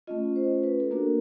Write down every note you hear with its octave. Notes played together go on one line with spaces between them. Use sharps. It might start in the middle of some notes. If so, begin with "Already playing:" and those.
A3 C#4 F4 D#5
C5
B4
A4
A#3 D4 F#4 A#4